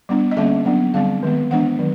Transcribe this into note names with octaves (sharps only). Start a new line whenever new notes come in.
G3 B3 D4
D#5
D3 G3 A#3 C#4 E5
F#3 B3 D4
D3 G3 C4 F5
D#3 G#3 B3
E3 G#3 B3 D4 F#5
D#3 F#3